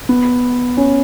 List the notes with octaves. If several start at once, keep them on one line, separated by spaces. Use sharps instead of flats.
B3
C#4